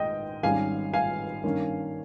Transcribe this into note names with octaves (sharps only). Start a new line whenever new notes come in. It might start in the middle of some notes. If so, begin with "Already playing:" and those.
Already playing: G#1 G#2 D#3 A#3 D#5 G5
G#1 G#2 G3 C#4 F5 G#5
F5 G#5
G2 D#3 A#3 C#4